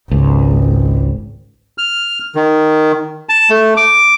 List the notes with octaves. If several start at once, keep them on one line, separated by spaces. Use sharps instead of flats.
G#1 C#2
F6
D#3
A5
A3
D6